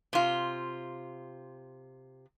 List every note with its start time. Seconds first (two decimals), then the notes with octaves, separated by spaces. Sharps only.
0.13 C3 F4